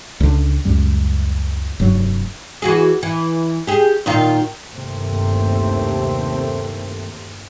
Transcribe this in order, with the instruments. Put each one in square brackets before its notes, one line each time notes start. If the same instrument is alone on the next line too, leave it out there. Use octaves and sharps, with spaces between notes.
[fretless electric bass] C#2 D3
C#2 F#2 G3
F1 G2 F#3
[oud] E3 F#4 G#4
E3
G4 G#4
A#2 D#3 F4
[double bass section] G1 D#2 C3 A3 C4